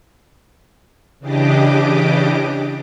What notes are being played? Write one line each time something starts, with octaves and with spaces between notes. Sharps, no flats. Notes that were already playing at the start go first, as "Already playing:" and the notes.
C#3 E3 D4 G4 D#5 D6